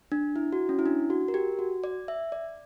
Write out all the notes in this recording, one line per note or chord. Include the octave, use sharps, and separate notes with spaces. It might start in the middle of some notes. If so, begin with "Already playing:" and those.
D4
E4
F#4
C#4
E4
D4
F#4
A#4
G4
F#4
D5
E5
D5